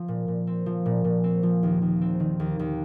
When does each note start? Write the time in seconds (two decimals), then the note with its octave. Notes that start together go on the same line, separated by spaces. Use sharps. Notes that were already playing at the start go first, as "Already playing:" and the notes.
Already playing: F3 C4
0.08 A#2
0.28 A#2
0.47 C4
0.66 F3
0.86 A#2
1.04 A#2
1.24 C4
1.43 F3
1.63 D#2
1.82 D#2
2.01 C4
2.20 D#3
2.40 D#2
2.59 D#2